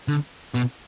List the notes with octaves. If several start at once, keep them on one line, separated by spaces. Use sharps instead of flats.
D3
B2